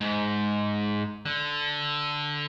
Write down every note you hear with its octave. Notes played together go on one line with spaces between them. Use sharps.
G#2
D3